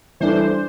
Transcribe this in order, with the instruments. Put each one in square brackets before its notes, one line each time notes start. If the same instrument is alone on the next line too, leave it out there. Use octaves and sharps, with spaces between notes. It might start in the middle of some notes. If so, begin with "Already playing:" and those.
[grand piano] E3 G3 D4 A4 [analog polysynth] C5